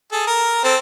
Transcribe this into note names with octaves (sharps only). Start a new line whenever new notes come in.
G#4 A4
A#4
C4 A4